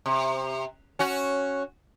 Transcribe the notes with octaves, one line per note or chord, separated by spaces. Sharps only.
C3
C#4 F#4